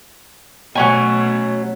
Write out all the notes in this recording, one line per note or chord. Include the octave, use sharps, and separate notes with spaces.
B2 F#3 A3 C#4 G#5